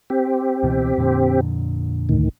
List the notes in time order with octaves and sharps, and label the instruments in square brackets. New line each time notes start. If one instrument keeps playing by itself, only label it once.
[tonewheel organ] C4 G4
[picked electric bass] C#2 B2 E3
F2 A#2 D3
[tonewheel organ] D2 A2 D#3